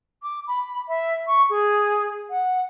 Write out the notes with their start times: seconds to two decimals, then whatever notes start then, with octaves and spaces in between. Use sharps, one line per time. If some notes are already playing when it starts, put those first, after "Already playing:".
0.23 D6
0.47 B5
0.88 E5
1.27 C#6
1.50 G#4
2.30 F#5